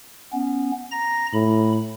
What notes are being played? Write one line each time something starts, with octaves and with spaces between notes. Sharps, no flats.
B3 C#4
A#5 A#6
A2 B5